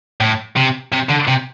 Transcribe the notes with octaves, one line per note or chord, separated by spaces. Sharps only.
A2
C3
C3
D3
C3